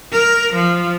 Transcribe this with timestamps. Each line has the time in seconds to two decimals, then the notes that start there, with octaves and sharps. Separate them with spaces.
0.12 A#4
0.53 F3